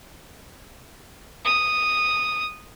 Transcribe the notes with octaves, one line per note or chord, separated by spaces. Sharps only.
D#6